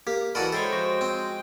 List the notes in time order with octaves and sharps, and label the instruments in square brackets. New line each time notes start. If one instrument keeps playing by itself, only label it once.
[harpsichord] A#3 [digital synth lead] G4
[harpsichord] E3 F#4 A#4 [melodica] A4 D5 A5 [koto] D#5 [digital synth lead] B5
[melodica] G#3 G5 [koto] E4 C5 C#5 [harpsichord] A4
[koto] F3 [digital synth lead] F#4
[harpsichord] C4